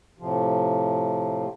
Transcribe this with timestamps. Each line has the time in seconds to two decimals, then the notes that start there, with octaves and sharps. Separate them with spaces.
0.19 A2 C3 F3